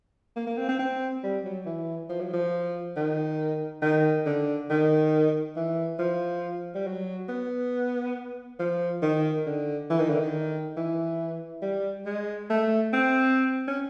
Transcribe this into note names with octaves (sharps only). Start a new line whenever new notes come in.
A#3
A#3
C4
C4
C4
G3
F#3
E3
F3
F#3
F3
D#3
D#3
D3
D#3
E3
F3
G3
F#3
B3
F3
D#3
D3
E3
D#3
D3
D#3
E3
G3
G#3
A3
C4
C#4